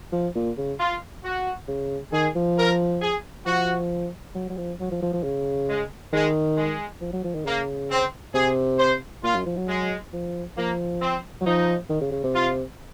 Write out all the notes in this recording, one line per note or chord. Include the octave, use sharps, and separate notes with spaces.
F3
A#2
C#3
F4
F#4
C#3
D#3 G#4
F3
A#4
G#4
F3 F#4
F#3
F#3
F3
F#3
F3
F3
F3
C#3
G#3
D#3 G#3
G#3
F3
F#3
F3
D#3
C#3 A#3
C4
C3 G#4
C5
A#2 F4
F#2
F3
F#3
G#3
F3
F3 A#3
C4
F#3
F3 D#4
D#3
C#3
C#3
C3
F4